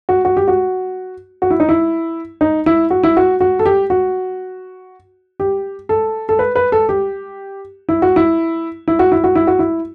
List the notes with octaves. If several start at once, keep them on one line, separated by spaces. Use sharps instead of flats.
F#4
F#4
G4
F#4
F#4
E4
D#4
E4
D#4
E4
F#4
E4
F#4
F#4
A4
G4
F#4
G4
A4
A4
B4
B4
A4
G4
E4
F#4
E4
E4
F#4
E4
F#4
E4
F#4
E4